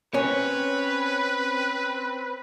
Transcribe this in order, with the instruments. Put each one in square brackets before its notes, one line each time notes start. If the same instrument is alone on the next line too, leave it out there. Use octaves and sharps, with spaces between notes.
[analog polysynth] C4 [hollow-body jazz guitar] C#4 [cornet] B4 [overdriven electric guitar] C#5